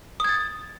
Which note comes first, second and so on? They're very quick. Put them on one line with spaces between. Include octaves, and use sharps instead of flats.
D#6 G#6 A6